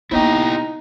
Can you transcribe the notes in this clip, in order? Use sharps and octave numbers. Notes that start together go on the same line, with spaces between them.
A#3 B3 D#4 E4 G4 G5